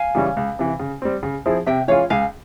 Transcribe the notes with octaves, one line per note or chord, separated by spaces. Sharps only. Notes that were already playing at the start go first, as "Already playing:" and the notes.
Already playing: F5 G#5
C#3 E3 G3 C#4
C#2
C3 E3
C#3
G3 C4
C#3
F3 C4 E4 G#4
C3 E5 G5
E3 G#3 C#4 F4 C#5 F5
C#2 F5 G#5